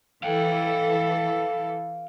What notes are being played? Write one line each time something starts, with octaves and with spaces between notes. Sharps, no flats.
E3 A4 F5 G5